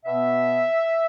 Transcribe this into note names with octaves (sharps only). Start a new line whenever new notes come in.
B2 B3 E5